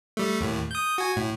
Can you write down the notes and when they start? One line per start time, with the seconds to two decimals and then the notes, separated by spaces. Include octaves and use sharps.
0.17 G3 A3
0.41 D#2 A2
0.71 D#6 G6
0.98 F#4 G#5
1.16 A2